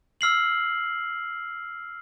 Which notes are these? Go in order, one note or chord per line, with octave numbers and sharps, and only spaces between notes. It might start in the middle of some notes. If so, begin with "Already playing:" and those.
E6 F6 C7 F#7